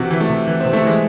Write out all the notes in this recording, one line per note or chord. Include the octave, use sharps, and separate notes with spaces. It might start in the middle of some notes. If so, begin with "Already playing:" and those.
Already playing: C3 E3 F#4
E3
A3
C3
E3
C3 C4
A3
E3 G#3